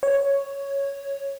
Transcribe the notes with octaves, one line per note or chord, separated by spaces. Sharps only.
C#5